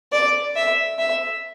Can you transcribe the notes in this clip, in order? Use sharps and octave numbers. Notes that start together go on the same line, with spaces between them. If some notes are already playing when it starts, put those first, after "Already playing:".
D5
E5
E5